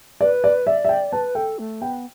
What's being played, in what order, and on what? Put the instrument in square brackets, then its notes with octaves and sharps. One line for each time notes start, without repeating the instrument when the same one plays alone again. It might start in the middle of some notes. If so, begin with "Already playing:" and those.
[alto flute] B4 [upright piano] D5
[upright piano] D5
[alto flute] D5 [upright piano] E5
[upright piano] E5
G5
[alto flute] B4 [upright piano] A5
[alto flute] A4 [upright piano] G5
[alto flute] A3
[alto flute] B3 [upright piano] G5